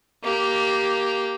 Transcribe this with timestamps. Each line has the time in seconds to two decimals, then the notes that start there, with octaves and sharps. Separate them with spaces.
0.23 A#3 G4